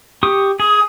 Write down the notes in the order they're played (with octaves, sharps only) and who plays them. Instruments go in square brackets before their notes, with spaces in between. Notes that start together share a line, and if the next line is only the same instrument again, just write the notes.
[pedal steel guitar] G4 C#6 D#6
[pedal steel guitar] G#4 [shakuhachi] D#6